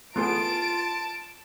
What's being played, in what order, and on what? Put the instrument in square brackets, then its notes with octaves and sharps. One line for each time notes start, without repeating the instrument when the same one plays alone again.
[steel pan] A3 B3 G#4 [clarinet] F4 [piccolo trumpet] A5 [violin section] D7